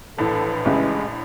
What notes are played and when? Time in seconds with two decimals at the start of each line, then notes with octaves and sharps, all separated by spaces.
0.18 A#1 A2 E3 A4
0.65 A1 C#3 G#3 E4